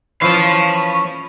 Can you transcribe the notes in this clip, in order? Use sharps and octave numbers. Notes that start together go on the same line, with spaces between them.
E3 F3 C#4 F5 A5 B5